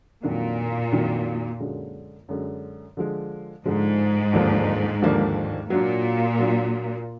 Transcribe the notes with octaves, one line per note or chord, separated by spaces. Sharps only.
F2 A#2 D#3 F#3 D4
F2 D#3 F#3 D4
F#2 D3 G#3
F#2 D3 G#3
D3 F3 G#3
G#2 D3 F3 G#3
D#2 D3 F3 A#3 D4
D#2 D3 F3 A#3 D4
A#2 F#3 D4 F4
F#3 D4 F4